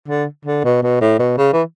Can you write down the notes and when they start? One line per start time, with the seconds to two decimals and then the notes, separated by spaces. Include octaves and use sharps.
0.08 D3
0.45 D3
0.64 B2
0.82 B2
1.01 A2
1.19 B2
1.38 C#3
1.53 E3